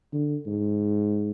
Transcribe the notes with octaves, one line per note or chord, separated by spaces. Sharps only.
D3
G#2